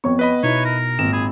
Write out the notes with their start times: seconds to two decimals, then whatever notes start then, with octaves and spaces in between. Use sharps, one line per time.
0.04 F2 B3 C#5 C#6
0.19 B4 D#5 B5
0.43 B2 D#4 E4 C#5
0.65 A#4
0.99 G#1 A#2 D#3 E7
1.13 G#4 B5